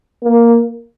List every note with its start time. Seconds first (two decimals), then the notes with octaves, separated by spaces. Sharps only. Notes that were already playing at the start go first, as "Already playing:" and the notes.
0.24 A#3